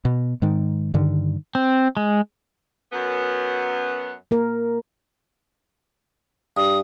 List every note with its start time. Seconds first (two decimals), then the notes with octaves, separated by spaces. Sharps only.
0.05 B2
0.42 G#2 D#3
0.94 G2 D3 D#3
1.55 C4
1.97 G#3
2.93 F#2 B3
4.31 A#3 A#4
6.57 G2 D#6